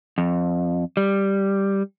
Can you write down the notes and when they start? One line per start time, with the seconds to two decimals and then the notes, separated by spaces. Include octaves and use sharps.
0.18 F2
0.97 G3